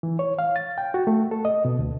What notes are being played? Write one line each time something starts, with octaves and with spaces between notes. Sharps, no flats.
E3
C#5
F5
A6
G5
F#4
A3
A4
D#5
B2
D2